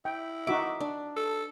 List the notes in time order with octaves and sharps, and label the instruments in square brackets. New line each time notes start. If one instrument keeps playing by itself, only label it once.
[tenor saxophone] E4 [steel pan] G5
[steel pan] D#4 F#4 E5 [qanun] D6
[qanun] D4
[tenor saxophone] A4